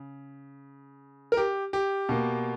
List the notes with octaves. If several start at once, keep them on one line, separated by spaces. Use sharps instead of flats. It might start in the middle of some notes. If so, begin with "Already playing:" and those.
Already playing: C#3
A#4
G4
G4
B2 A#3